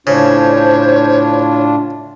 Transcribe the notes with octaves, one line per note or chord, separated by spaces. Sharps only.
A2 C#3 D4 F4 C5 C#5